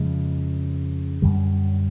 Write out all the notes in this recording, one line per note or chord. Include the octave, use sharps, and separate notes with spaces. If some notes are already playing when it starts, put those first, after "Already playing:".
Already playing: F2 C#3 F3 G#3
F#2 D3 G3